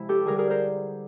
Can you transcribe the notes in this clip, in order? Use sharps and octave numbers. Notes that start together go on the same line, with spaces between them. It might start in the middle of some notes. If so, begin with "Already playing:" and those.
Already playing: C3 F3 G#3 E4
G4 A4
D3 G3 G#4 A#4
G#4 A#4
A#4 C5